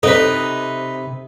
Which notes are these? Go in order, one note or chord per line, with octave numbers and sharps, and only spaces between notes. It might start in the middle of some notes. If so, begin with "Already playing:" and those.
C3 D#4 A4 B4 C5